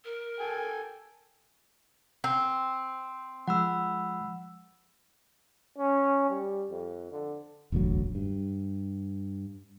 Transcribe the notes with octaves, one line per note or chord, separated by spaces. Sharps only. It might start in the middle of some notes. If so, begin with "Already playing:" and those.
A#4
A4 G5 G#5
C4
F3 G#3 F#5 B5 E6
C#4
G3
F2
D3
E1 A1 D2 F#3
G2